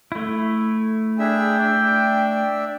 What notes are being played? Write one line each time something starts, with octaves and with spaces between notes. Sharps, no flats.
A3 E4
D4 G#4 E5 G5
D4 D5 E5